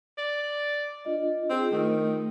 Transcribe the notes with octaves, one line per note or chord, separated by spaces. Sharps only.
D5
D4 F4 D#5
C4 F4 G#4
D#3 A3